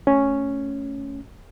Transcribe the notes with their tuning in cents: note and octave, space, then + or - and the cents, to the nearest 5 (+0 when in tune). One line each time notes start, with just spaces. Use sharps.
A3 +0 C#4 +0